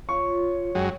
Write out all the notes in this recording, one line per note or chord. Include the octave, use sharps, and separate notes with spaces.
F4 C#5 C#6
F#2 F#3 G#3 G5